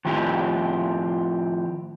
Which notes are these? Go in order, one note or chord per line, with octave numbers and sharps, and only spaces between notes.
A2 D#3 F3 C4 E4 G4